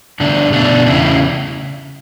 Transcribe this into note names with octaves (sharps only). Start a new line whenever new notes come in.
G2 D3 A3 D4
B2 A3 D4
E2 C#3 A3 E4